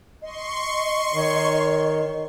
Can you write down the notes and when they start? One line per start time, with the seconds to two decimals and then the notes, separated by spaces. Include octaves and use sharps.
0.22 D#5 C6 C#6
1.14 D#3 C#5